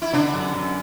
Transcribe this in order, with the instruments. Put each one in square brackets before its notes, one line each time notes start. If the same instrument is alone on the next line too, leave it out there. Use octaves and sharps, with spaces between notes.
[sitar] E4
[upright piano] D3 [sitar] B3 D4
[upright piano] F#2
F#2